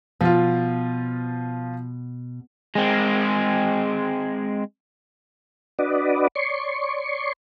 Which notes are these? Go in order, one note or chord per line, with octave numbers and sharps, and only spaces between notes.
B2 F3 F4
G#3 C4
D4 F#4 B4 D5 D#5
C#5 D5 C6 C#6